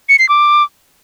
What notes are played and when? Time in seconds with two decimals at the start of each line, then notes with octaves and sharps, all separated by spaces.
0.09 C#7
0.19 C7
0.29 D6